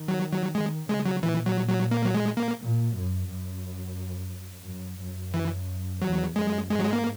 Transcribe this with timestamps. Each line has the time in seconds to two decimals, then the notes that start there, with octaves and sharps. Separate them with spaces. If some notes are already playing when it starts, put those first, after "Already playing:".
Already playing: D#3
0.08 F#3
0.32 F#3
0.55 D#3 G#3
0.88 C#3 G#3
1.06 F#3
1.23 A#2 E3
1.46 F#3
1.68 F#3
1.91 A#3
2.05 F#3
2.14 G#3
2.37 A#3
2.60 A#2
2.94 F#2
3.28 F#2
4.65 F#2
4.99 F#2
5.34 E3
6.02 E2 F#3
6.35 F#2 G#3
6.70 G#2 G#3
6.79 F#3
6.85 G#3
6.93 A#3